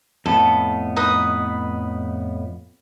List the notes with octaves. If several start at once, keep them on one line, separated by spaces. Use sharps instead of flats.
F2 A2 B3 A4
D#4 B4 D#6